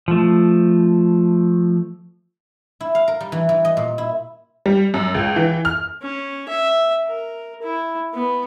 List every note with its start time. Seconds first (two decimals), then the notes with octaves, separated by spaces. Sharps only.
0.08 F3 A3
2.81 E4
2.95 F5
3.08 A#4
3.21 G3
3.32 E3
3.49 E3
3.65 D#5
3.77 A#2
3.98 E4
4.66 G3
4.94 F#2
5.15 C#2
5.36 E3
5.65 F6
6.02 C#4
6.49 E5
7.07 A#4
7.62 E4
8.14 B3